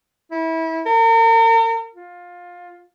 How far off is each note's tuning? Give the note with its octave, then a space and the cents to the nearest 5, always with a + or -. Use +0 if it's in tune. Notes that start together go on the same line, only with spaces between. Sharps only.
E4 -25
A#4 -40
F4 +20